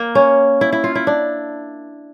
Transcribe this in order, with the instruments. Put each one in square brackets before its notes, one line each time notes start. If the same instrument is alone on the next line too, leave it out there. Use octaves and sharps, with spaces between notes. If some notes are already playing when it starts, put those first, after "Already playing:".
Already playing: [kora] A#3
C#4
E4
E4
F4
E4
D4